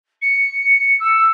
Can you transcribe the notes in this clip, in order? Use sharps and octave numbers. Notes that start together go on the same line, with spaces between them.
C#7
E6